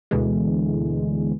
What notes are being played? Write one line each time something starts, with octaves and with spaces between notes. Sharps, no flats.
D2 B2 D3 E3 G#3